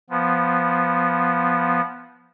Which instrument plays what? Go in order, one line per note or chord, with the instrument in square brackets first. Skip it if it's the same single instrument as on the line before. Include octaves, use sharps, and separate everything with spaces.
[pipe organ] F3 B3